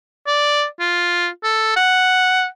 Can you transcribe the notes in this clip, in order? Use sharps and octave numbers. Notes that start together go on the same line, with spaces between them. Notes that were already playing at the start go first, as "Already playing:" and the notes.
D5
F4
A4
F#5